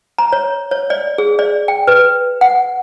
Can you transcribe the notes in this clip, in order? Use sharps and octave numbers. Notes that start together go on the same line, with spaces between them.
A#5
C#5
C#5
D5
G#4
D5
G5
B4
F#5